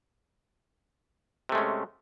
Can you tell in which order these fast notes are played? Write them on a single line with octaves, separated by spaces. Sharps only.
C3 A3 G#3 C#4